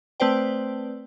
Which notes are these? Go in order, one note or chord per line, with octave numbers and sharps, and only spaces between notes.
A3 C4 B4 C5 D5 G5